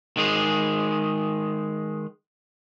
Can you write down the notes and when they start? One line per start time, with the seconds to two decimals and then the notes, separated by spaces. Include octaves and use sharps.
0.17 D#3 G#3 G#4